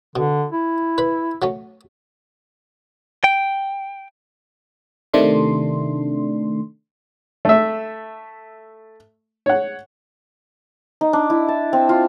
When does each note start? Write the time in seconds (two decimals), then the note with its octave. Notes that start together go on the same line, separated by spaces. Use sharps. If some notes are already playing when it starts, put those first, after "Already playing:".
0.16 B2 D3
0.52 E4
0.98 B4 B5
1.42 F#3 A3 C#4
3.24 G5
5.14 C3 D#3 A3 D4 C6
7.45 A3 E5
9.46 C#5 F#5
11.01 D#4
11.13 D4
11.30 E4
11.48 A5
11.73 C4
11.89 F4